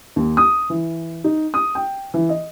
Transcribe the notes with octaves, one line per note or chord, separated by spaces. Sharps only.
D#2
D#6
E3
D#4
D#6
G5
E3
D#5